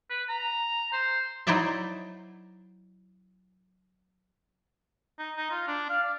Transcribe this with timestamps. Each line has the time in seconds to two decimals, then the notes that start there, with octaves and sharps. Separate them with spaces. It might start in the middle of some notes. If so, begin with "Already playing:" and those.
0.10 B4
0.29 A#5
0.93 C5
1.47 F#3 D#4 E4 C5 D5 E5
5.19 D#4
5.36 D#4
5.51 F4
5.68 D4
5.90 F5
6.03 D5